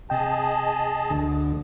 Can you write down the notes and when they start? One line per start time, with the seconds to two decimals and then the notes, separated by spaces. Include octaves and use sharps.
0.10 C3 G#4 D#5 G5 A5
1.10 D2